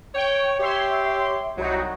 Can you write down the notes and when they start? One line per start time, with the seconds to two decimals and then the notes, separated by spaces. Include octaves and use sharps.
0.14 C#5 G5 C#6
0.59 G4 C#5 E5 C6
1.57 C2 F#3 D#4 F#4